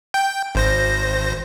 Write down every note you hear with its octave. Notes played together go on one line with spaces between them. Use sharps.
G5 G6
G#1 C5 A#6